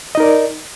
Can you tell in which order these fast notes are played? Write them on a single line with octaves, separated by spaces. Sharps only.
D#5 D#4 A#4 D5